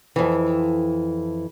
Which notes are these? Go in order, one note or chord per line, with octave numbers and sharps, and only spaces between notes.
F2 E3